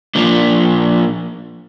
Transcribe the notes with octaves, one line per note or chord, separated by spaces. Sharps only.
F3 A#3 D4